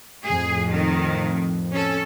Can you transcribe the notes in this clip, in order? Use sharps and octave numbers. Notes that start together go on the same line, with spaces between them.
F2 A2 G#4
D#3
C#4 A4